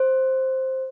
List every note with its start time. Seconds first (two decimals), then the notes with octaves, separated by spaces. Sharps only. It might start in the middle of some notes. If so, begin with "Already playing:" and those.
Already playing: C5